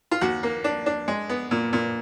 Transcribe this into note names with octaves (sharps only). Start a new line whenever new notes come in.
F4
D#2 F#4
A#3
D4
D4
G#3
B3
A#2
A#2